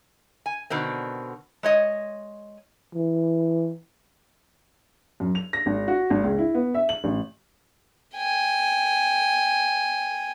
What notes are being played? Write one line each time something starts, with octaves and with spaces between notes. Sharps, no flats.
G#5
B2 D3 D#3 C4
G#3 C#5 D#5
E3
F#2
F7
A#6
G#1
F#4
G#1
C#2
E4
B3
E5
F#7
A1
G5 G#5